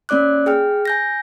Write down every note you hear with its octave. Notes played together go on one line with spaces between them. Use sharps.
A#3 C#4 D5 D6 F#6
G#4 G5 F6
G#5 G6 A#6